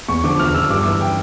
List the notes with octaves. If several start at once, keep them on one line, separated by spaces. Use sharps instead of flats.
E2 C#6
D3 F3 D6
E2 F6
D3 F3 E6
G2 D6
E3 E6
G5